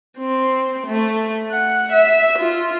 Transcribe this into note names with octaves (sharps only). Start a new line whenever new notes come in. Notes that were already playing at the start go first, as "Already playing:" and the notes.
C4
A3
F#5
E5
F4